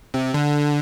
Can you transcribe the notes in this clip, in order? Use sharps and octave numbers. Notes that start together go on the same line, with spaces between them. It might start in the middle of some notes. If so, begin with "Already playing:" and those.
C3
D3